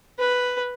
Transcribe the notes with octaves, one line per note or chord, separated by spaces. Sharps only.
B4